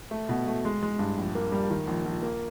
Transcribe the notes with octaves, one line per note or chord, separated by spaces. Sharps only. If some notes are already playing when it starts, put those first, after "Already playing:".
A3
B2
A3
G#3
G#3
G2
A#1
A#3
G3
D#3
A#1
A#1
A#3